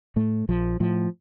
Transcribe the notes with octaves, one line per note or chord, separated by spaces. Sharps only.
A2 A3
A#1 F3
A2 F3